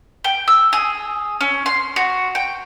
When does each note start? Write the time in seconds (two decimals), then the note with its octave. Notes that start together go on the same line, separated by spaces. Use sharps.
0.24 G5
0.48 E6
0.73 G#4
1.41 C#4
1.66 C6
1.96 F#4
2.35 G5